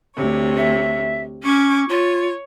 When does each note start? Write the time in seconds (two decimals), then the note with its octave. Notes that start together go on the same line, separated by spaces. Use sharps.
0.15 D2 C3 C#5
0.57 E5
1.43 C#4 C#6 D6 G#6
1.88 F4 C#5